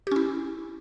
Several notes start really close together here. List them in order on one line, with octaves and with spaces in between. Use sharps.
G4 C#4 E4